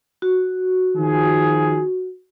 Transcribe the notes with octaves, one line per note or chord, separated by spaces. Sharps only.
F#4
D#3 F3 G#4